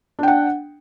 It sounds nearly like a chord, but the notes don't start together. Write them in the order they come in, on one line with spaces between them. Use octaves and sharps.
D4 G5 F#5